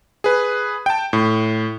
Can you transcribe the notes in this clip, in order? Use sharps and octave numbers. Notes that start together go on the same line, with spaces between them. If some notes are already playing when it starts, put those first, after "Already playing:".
G#4 B4
G5 A5
A2